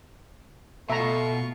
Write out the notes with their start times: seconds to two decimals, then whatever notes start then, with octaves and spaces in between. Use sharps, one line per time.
0.90 B2 A3 F4 E5 A#5 C#6